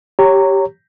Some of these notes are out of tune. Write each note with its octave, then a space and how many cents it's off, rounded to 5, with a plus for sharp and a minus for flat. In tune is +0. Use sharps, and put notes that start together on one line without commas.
G4 +0 C#5 +0 A#5 -20